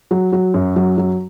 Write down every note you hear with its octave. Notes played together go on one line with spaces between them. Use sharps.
F#3
F#3
F#2
F#3
F#3